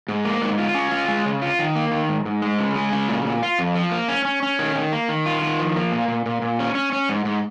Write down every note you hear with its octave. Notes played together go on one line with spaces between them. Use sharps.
G#2
A#3
G#2
F4
C#4
F4
G#3
C#3
F4
D#3
A#3
D#3
G#2
G#2
G#3
C#3
G#3
C#3
A#2
A#2
F4
F2
F3
A#3
C#4
C#4
C#4
D#3
D#3
A#3
D#3
F4
D#3
F3
A#3
A#2
A#2
A#2
A#2
C#4
C#4
C#4
G#2
G#2